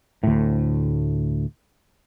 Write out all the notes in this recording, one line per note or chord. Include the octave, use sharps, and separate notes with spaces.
D2 A2